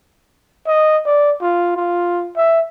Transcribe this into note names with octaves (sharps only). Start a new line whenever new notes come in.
D#5
D5
F4
F4
E5